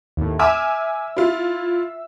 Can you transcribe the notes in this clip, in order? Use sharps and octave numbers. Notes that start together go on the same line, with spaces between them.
D#2 A2
E5 G#5 D6 E6 F6
E4 F4